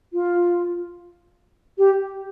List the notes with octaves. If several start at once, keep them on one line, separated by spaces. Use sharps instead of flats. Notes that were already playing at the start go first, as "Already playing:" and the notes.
F4
G4